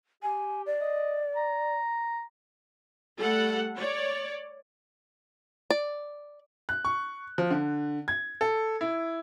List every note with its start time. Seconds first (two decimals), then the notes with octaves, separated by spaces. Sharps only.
0.23 G4 G#5
0.66 D5
0.81 D#5
1.36 A#5
3.19 G3 A3 A4 F#5
3.76 C#5 D5
5.70 D5
6.69 F#6
6.85 C#6
7.38 F3
7.51 D3
8.08 G#6
8.41 A4
8.81 E4